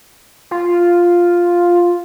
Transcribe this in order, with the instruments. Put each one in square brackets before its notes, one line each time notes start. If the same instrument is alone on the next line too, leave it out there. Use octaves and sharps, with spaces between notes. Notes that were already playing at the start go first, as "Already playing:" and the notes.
[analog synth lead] F4